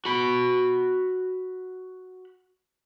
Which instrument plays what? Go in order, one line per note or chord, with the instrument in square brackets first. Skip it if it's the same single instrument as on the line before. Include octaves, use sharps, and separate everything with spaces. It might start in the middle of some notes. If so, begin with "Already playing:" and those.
[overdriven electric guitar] F#4 B5